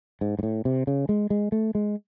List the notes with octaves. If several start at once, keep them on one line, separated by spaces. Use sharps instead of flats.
G#2
G#2
A2
C3
C#3
G#3
G#3
A3
G#3